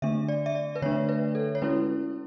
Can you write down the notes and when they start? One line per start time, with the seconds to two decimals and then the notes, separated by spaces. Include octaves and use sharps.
0.02 D3 A3 D4 E5
0.28 D5
0.46 E5
0.55 D5
0.75 B4
0.82 D3 A3 D4 C#5
1.09 B4
1.35 A4
1.55 C#5
1.62 G#3 C#4 E4 B4